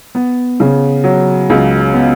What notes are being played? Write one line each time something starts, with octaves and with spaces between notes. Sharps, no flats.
B3
C#3
F#3
C#2
B3